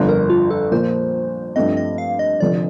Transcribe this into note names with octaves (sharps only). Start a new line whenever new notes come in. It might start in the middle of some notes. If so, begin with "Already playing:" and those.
Already playing: G1 F2 D3
A#4
F4
A4
A#2 F3 A#3 C5
G2 F3 A3 C4 D#5
D#5
F5
D#5
F1 F2 D3 D5